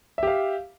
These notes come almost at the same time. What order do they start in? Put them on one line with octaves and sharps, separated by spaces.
E5 G4 F5